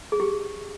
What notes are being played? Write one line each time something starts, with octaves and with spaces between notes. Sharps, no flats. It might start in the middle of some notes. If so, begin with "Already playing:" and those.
G#4
G4